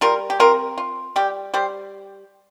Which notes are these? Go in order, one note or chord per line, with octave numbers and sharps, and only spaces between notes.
G3 F4 A#4
G4
C4 F4 A#4
F4
G3 G4
G3 G4 C5